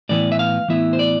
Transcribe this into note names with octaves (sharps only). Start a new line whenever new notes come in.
A2 E3 B3 E4 D5
E5
F5
A2 E3 B3 E4 E5
C5
D5